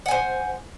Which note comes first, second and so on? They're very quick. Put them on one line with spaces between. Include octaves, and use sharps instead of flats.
F#5 G#5 C5